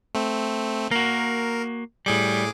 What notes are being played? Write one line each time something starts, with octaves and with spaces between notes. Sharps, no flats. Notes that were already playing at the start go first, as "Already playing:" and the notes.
A3 C4
A#3 F#4 A#4
A2 G3 G#4 D6